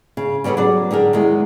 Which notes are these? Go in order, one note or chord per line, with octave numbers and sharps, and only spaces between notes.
C#3
C#3 G3 B3 C#4 A4
F#3 G#4 D5
D3 G4 G#4 A#4
E2 D#3 G#3